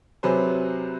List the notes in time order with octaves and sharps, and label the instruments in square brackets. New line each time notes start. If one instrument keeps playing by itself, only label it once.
[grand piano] C3 F#3 G#4 B4 C5